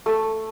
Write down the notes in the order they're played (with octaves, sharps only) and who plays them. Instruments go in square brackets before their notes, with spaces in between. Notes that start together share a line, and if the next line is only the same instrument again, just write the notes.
[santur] A3